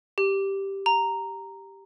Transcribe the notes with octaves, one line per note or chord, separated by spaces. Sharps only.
G4
A#5